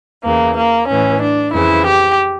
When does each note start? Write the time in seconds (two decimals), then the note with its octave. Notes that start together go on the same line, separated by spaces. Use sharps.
0.23 E2 C#3 E3 A#3
0.56 A#3
0.88 A2 E3 C#4
1.21 D4
1.52 F2 C#3 E3 E4
1.86 G4